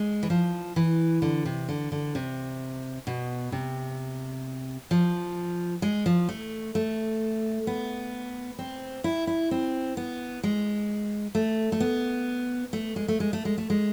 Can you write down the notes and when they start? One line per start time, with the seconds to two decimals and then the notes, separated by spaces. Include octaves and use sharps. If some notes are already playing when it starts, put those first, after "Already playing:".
Already playing: G#3
0.23 E3
0.30 F3
0.76 E3
1.22 D3
1.45 C3
1.69 D3
1.92 D3
2.15 C3
3.07 B2
3.52 C3
4.91 F3
5.82 G#3
6.06 F3
6.29 A3
6.75 A3
7.67 B3
8.59 C4
9.04 E4
9.27 E4
9.51 C4
9.97 B3
10.43 G#3
11.35 A3
11.72 A3
11.80 B3
12.73 A3
12.96 G#3
13.08 A3
13.20 G#3
13.33 A3
13.45 G#3
13.58 A3
13.70 G#3